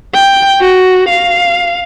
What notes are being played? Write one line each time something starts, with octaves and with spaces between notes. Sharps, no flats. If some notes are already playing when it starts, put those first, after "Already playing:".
G5
F#4
F5